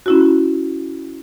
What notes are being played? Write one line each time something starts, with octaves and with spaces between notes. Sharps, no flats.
C#4 E4 F#4